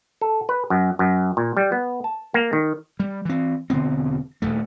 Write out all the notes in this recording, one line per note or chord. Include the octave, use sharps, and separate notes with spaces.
A4
B4
F#2
F#2
A#2
G3
B3
A5
A#3
D#3
G3
E3 C4
E1 D3 B3 C4
D#1 D#2 A3